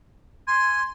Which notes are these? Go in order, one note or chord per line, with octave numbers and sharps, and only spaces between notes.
G#5 C6